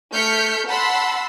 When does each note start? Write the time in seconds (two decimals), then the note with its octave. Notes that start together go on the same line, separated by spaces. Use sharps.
0.11 A3 F6 G6 B6 C#7
0.67 F#5 A5 B5 C6 E6